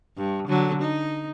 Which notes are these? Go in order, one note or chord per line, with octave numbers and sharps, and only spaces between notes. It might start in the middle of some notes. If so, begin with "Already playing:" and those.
G2
D3 F#3
D#4